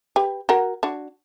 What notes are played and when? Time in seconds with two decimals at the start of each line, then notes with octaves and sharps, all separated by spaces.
0.16 G4 B4
0.49 F#4 A#4
0.83 D4 F#4